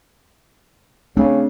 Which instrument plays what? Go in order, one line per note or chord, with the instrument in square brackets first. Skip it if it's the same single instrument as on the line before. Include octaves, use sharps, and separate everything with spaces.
[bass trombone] C#3 [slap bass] A3 C4 D4